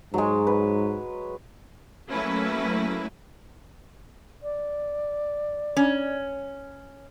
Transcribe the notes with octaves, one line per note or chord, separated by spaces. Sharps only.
G#2 F#3 G#3
B4
F#3 A3 A#3 C#4 E4 B4
D5
C#4